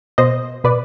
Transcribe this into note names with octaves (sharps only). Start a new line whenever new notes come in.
B2 C5 D#5
B2 B4 D5